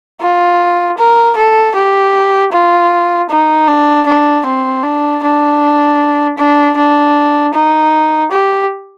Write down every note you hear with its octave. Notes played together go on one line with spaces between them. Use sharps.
F4
A#4
A4
G4
F4
D#4
D4
D4
C4
D4
D4
D4
D4
D#4
G4